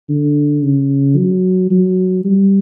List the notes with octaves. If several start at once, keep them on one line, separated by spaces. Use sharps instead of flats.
D3
C#3
F#3
F#3
G3